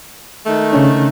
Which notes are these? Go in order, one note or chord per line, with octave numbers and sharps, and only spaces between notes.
D#3 G#3 A3
C#3 C#4 D4